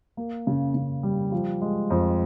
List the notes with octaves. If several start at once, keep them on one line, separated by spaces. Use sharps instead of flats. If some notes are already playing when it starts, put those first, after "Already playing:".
A#3
C#3
C#3
G3
F3
G#3
F2